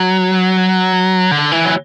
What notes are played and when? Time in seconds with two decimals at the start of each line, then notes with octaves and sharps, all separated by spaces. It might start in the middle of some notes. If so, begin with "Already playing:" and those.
Already playing: F#3
1.31 D3
1.52 E3
1.65 F#3